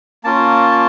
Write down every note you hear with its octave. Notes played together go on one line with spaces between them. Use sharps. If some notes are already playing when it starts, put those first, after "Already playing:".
A#3 C#4 F4 A5